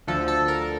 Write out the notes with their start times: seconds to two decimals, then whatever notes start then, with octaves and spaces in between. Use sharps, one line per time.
0.07 D2 D3 F3 A4
0.28 A4
0.48 A#4